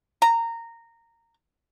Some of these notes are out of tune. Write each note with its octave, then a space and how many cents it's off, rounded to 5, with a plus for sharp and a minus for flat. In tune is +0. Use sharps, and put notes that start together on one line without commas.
A#5 -15